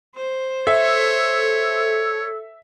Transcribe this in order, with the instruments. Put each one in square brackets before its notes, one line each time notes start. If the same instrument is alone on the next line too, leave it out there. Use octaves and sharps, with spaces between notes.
[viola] C5
[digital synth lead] A4 [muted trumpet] C#5 [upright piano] E5